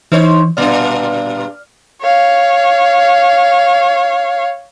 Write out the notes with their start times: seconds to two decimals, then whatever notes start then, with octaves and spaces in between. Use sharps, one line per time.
0.12 E3 D#4 C5 C#5
0.57 G2 A#2 G3 D5 F6
2.02 C#5 F5